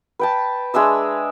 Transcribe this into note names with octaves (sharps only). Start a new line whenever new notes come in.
B4 G5 A5
G#3 D4 E5 E6